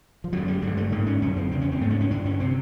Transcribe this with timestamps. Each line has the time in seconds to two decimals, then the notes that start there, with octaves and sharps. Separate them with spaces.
0.24 F3
0.33 F#2 D3 F#3
0.48 G3
0.62 G2 D3 G#3
0.77 A3
0.92 G#2 A#3
1.06 C#4
1.21 F#2 D3 C#4
1.37 C4
1.51 E2 C#3 C4
1.61 C#4
1.72 C4
1.81 G#2 A3
1.91 C#4
2.01 C#4
2.10 G2 D3 D4
2.26 C#4
2.40 C3 C4